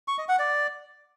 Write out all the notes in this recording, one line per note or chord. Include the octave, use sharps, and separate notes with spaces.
C#6
D#5
F#5
D5